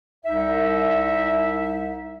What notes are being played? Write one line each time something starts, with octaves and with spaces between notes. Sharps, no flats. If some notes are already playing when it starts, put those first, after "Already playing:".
C2 D#4 E5